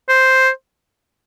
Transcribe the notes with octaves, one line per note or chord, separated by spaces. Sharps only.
C5